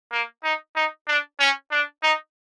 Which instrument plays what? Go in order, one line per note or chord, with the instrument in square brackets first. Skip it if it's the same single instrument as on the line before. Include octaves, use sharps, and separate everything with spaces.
[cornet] A#3
D#4
D#4
D4
C#4
D4
D#4